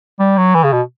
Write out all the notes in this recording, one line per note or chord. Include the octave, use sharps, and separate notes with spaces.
G3
F#3
E3
C#3
B2